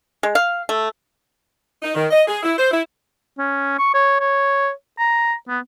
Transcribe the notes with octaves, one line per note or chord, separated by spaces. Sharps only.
G#3
F5
A3
D#4
D#3
D#5
G#4
E4
C5
E4
C#4
C#6
C#5
C#5
A#5
B3